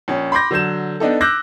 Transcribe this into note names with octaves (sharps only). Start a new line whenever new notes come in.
A#1 C#4
B5 C6 D6 G6 A#6
D3 F#3 G6 E7
B3 D4 D#4 A4
D6 E6 F#6 G6 A#6